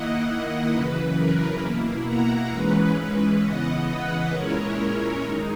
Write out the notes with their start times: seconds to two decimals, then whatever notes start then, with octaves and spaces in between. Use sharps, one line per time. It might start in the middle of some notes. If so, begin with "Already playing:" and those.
Already playing: D#3 A#3 E4 D#5 F#5
0.70 F#2 C#3 E3 B4
1.15 A#4
1.60 B2 A#3 E4
2.05 F#5 A#5
2.51 G#2 E3 G#3 C#4 B4
2.97 B4
3.41 C#3 E3 B3 D#5 F#5
3.86 B4 D#5
4.31 A#2 G#3 C#4 E4 A#4 C#5
5.22 F#2 D#3 G#3 D#4